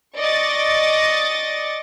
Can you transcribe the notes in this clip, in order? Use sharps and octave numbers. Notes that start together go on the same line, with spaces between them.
D5 D#5 C#6 A6 A#6